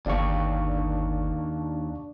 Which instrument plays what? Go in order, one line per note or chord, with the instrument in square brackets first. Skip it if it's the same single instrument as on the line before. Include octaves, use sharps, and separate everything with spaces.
[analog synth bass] G1 [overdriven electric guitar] D#2 [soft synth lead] D4 [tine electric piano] D5 F5 C#6